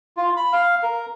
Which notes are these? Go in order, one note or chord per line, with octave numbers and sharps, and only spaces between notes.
F4
B5
F5
A#4